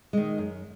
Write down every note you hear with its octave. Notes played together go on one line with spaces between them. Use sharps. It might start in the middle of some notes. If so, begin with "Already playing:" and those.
D#3 G#3
F#2